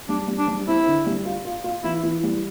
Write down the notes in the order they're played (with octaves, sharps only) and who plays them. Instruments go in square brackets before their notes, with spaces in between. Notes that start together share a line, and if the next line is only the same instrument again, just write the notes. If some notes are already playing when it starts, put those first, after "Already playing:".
[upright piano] G3 [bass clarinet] D4
[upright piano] G3
[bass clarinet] D4
[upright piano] G3
[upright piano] C4 [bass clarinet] E4
[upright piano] D3
G3
F4
F4
F4
[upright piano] E3 [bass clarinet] E4
[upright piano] E3
G3